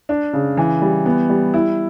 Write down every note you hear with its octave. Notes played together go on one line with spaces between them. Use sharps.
D4
C#3
E3
G3
B3
G3
E4